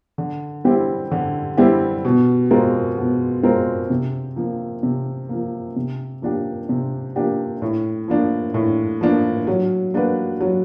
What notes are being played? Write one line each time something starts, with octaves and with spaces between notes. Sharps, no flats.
D3
G3 C4 E4 G4
D3
G3 C4 E4 G4
B2
G#3 C4 F4 A#4
B2
G#3 C4 F4 A#4
C3
F3 A#3
C3
F3 A#3
C3
F3 A#3 D4 G4
C3
F3 A#3 D4 G4
A2
F3 A#3 D4
A2
F3 A#3 D4
F#3
A#3 D4 F#4 B4
F#3